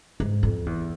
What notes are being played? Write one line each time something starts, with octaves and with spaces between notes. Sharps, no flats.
G#2
F2
E2